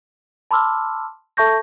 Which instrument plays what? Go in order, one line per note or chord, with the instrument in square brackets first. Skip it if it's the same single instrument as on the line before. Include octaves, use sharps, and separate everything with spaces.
[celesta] A5 B5 C6 D6 E6 F6
A4 E5 A5 C#6 G6 A#6